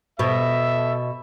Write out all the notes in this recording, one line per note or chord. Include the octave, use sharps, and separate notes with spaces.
B2 A4 E5